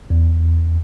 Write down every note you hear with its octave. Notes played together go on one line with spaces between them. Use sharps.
E2